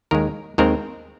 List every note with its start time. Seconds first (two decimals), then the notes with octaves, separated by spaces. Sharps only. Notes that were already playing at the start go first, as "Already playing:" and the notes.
0.11 D#2 D#3 G#3 A#4
0.58 D#2 D#3 G#3 C4 A#4